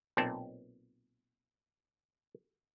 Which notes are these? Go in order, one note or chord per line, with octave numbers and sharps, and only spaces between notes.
B1 A#2 C4 A5